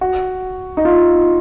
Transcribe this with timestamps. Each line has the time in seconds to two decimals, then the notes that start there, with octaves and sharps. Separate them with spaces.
0.01 F#4
0.77 D#4
0.85 F4